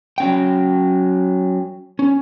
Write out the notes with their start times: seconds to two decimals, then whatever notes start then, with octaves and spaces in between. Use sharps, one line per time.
0.18 F#3 C#4 G5
1.99 C#4